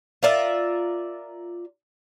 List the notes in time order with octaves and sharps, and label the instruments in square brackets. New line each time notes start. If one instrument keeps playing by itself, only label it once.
[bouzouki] F4 A#4 D5 E5